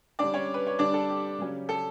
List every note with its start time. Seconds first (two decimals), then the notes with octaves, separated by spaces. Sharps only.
0.19 D3 G3 C#4 D4 D5
0.34 C#4 C#5
0.54 B4
0.67 C#5
0.79 D3 G3 D4 D5
0.94 A4
1.09 G4
1.38 C#3 F#3 C#4
1.69 A4